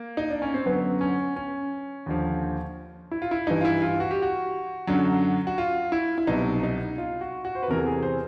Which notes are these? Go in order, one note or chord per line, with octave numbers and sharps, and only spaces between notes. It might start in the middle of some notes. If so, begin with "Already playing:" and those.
Already playing: A#3
D#4
D4
C#4
C4
F#2 D3 F#3 B3
C#4
C#4
D#2 D3 F3
E4
F4
E4
G2 E3 D#4
F4
E4
F4
F#4
G4
F#4
F#2 D3 F#3
F#4
F4
E4
E4
C2 B2 F#3 D#4
D#4
F4
F#4
F#4
C5
B4
E2 C3 E3 A#4
A4
G#4
C5